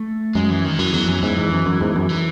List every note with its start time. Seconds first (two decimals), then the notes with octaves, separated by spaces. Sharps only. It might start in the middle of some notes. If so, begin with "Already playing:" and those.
Already playing: A3
0.35 F#2 G#3
0.50 E3
0.65 D#3
0.79 F#2 E3
0.93 E2 F#3
1.08 F#2 E3
1.23 E2 G#2 E3
1.37 E2 G#2
1.53 F#2
1.66 F#2
1.81 E2 G#2
1.96 F#2
2.10 E3